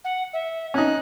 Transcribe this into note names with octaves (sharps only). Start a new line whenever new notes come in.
F#5
E5
C#4 D#4 F#6